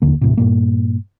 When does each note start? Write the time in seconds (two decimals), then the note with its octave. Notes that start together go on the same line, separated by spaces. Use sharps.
0.02 F1 D#2 D3 A#3
0.21 D#2 A2 C3
0.37 G2 A#2 A#3